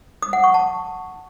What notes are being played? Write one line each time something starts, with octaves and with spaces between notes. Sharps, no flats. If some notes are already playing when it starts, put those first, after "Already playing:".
D#6
F#5
C#6
A5